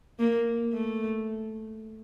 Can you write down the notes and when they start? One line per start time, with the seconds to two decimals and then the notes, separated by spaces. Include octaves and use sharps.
0.19 A#3
0.74 A3